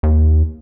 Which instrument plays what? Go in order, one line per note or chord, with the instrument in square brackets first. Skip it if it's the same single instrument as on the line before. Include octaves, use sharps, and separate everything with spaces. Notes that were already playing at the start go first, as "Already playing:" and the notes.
[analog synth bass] D#2